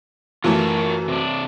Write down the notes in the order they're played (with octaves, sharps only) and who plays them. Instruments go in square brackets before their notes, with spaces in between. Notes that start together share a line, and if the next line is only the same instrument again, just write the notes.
[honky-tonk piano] F#2 E3 A3 [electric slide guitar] F4 A#4 A5
[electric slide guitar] C3 D4